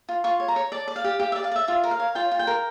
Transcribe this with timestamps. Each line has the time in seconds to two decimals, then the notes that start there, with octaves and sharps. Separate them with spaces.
0.09 F4
0.24 F4 C#6
0.40 C#5
0.48 A#5
0.56 C#5
0.72 D5 A5
0.88 D5
0.96 F5
1.04 G4
1.20 G4 F5
1.32 E5
1.36 D5
1.44 F5
1.51 D5 E5
1.68 F4 E5
1.84 A#4
1.91 F5
2.00 C#5
2.15 F4 G5
2.31 F4
2.39 G5
2.47 A#4